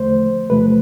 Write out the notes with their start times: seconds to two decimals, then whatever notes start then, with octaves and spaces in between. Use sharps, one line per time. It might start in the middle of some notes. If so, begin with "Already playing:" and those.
Already playing: E2 D3 F3 A3 C5
0.50 E2 C3 F3 A3 B4